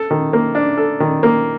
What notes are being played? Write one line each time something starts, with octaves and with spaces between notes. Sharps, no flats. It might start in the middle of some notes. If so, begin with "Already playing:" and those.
Already playing: A4
D#3
A#3
D4
A4
D#3
A#3